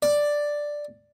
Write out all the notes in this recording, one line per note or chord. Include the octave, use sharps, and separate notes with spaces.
D5